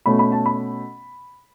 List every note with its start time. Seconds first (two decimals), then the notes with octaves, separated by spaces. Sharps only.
0.06 B2 A3 C#4 B5
0.19 B5
0.32 A5
0.46 B5